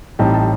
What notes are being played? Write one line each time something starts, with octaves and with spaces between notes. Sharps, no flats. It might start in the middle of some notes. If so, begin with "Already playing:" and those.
A1 A2 G3 C4 D#4 A5
A5